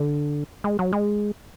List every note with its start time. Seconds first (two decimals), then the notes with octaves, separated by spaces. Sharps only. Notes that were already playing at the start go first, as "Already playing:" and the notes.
Already playing: D3
0.64 G#3
0.79 F#3
0.93 G#3